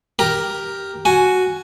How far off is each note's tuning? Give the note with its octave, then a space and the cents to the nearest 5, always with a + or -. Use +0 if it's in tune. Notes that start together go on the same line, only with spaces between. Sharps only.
G4 -5 A#4 +0 A#5 +0
F#4 +0 G#5 +10